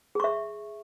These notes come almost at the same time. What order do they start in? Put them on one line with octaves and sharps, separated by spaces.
G#4 C#6 E5